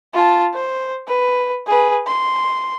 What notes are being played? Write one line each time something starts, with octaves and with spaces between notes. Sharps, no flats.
F4 A5
C5
B4
G#4 B4
C6